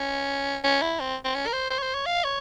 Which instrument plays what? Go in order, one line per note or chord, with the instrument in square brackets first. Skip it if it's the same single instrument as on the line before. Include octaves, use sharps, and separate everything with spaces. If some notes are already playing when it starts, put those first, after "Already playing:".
Already playing: [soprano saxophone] C#4
C#4
E4
C4
C4
C#4
A#4
C5
C5
C#5
C5
C#5
F5
C#5